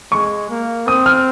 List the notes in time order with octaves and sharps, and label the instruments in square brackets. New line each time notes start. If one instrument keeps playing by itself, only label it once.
[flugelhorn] G#3 [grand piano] C#6
[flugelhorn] A#3
[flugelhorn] C4 [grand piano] D#6
[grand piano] F6